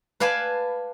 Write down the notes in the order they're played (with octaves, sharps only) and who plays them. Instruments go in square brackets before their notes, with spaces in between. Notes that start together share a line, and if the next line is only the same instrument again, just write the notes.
[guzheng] B4 D5 F5 G#5 A5 B5